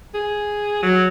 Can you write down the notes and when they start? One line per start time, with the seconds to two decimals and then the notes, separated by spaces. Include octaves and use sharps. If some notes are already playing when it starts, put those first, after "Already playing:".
0.14 G#4
0.83 F#3